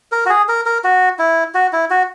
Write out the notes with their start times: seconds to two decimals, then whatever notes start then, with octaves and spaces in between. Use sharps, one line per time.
0.12 A#4
0.26 F#4
0.30 G#4
0.48 A#4
0.66 A#4
0.84 F#4
1.19 E4
1.54 F#4
1.73 E4
1.90 F#4